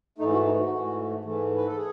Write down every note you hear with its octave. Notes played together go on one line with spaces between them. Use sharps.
G#2 E3 A3 D#4
F#4
D#4
F#4
G#2 E3 A3
G#2 E3 A3
B4
A4
G#4